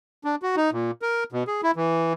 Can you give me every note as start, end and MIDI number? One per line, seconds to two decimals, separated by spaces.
0.24 0.36 62
0.42 0.56 66
0.56 0.70 63
0.72 0.91 46
1.02 1.24 70
1.32 1.43 47
1.47 1.61 68
1.63 1.71 64
1.76 2.13 52